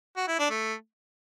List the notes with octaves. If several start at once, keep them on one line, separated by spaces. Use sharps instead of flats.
F#4
E4
D4
A3